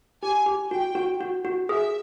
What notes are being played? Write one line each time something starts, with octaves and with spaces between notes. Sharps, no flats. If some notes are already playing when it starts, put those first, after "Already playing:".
G4 G#5
G4
F#4 G5
F#4
F#4
F#4
G#4 E5